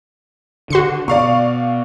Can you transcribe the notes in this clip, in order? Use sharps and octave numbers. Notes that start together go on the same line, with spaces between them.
D3 F#4 C6 C#7
B2 D5 F5 C#6